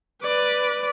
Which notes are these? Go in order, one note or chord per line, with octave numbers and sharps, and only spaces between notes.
B4 D5